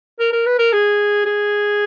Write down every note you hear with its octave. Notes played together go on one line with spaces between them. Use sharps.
A#4
A#4
B4
A#4
G#4
G#4